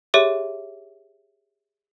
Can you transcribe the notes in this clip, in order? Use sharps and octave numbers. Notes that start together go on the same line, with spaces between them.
G4 G#4 C#5 E5 D6